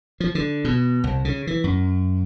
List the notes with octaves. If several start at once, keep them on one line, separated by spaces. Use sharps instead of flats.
F3
D3
B2
C2
C#3
E3
F#2